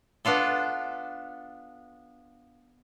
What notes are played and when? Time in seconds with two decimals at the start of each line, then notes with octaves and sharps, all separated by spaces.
0.25 B3 D4 F4 A4